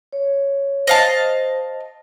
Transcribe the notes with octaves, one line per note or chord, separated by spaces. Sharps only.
C#5
C5 D#5 F5 A5